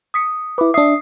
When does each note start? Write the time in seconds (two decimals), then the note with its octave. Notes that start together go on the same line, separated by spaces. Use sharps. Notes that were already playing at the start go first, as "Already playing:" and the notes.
0.14 D#6 B6 C#7
0.58 E4 B4 D6
0.74 D4 E5 D#6 C7